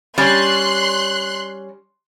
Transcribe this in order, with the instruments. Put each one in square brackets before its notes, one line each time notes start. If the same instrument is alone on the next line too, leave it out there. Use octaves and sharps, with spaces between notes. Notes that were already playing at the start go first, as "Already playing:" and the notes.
[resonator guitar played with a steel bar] G3 C#4 [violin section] C6 F#6